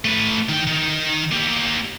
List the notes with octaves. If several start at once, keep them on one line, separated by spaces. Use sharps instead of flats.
A3 B4
D#3 G5
D#3
A#3 G4